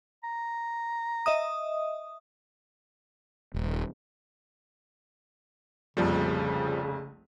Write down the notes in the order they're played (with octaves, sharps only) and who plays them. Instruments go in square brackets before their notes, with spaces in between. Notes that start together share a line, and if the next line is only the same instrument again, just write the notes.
[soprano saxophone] A#5
[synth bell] D#5 E5 D#6
[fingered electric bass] D#1
[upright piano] F1 A#1 F2 [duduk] C#3 [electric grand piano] F3 G3